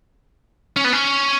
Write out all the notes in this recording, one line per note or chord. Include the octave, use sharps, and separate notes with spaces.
C#4
B3
C#4